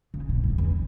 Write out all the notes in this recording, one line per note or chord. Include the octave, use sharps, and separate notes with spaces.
C#3
B2
G#2
E2